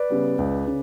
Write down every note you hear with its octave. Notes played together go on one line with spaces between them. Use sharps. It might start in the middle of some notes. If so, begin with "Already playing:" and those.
Already playing: B4 D5
C#3 G3 B3
C#2
C#3